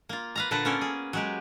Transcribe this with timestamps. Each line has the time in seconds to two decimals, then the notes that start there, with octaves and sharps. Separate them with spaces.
0.09 A#3 F4
0.35 B4 F5 A#5
0.51 A#2 D3 B4 C5 A5 A#5
0.65 A#3 B3 C#4 A4 A#4
0.81 G#4
1.13 F#3 G#3 G4